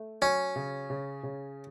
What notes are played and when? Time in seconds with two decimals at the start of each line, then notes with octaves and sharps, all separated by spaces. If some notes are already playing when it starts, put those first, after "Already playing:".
Already playing: A3
0.21 F#3 C#4
0.56 C#3
0.90 C#3
1.23 C#3